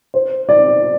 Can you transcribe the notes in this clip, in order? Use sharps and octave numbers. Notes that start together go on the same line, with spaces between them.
C5
D5